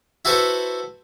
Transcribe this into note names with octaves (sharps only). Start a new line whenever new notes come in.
E4 F#4 A4 B4 C5